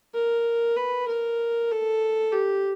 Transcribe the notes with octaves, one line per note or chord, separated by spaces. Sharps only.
A#4
B4
A#4
A4
G4